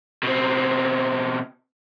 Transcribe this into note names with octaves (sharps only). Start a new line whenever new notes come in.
B2 C4